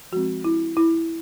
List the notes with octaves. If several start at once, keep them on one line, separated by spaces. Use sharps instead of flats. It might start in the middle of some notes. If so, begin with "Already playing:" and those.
F3 G#3 C4 F#4
E4
E4